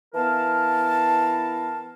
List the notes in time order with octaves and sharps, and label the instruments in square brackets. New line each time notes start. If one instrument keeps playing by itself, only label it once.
[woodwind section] E3 B3 E4 A#4 F5 A5